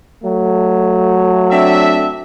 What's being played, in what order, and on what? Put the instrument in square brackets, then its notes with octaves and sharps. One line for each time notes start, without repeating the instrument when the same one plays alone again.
[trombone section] F#3 A3
[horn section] C4 D4 E5